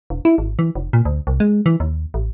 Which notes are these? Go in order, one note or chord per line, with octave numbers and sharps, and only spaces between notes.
E1
E4
G#1
E3
F1
A#2
D2
C2
G#3
E3
D#2
A1